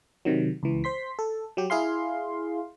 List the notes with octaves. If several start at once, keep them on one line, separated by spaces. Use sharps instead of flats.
C3 D#3 F#3
C#2 E3
C5 C6 B6
A4
F#3 G4
E4 G#4 F5 C6